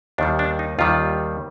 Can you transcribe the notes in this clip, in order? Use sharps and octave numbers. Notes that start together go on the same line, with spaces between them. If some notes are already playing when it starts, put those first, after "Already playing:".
D#2 D#3 G3 D4
D4
D#4
D#2 D#3 G3 F4